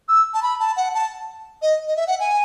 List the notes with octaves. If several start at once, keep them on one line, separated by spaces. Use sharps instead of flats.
E6
A5
B5
A5
F#5
A5
D#5
D#5
E5
F#5
G#5